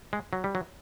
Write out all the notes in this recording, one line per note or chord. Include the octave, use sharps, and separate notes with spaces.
G#3
F#3
G3
F#3